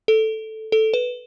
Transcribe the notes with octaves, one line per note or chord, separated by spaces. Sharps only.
A4
A4
B4